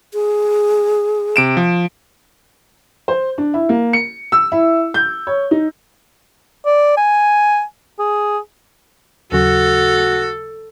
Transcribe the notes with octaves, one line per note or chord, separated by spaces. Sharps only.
G#4
C3 D7 E7
F3
C5
D4
E4
A#3
C#7
E6
E4
G6
C#5
D#4
D5
G#5
G#4
D#2 C#3 F#3 F#4 A4